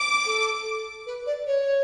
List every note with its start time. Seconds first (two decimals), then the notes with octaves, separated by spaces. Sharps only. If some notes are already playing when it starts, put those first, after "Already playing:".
Already playing: D6
0.26 A4
1.07 B4
1.26 D5
1.46 C#5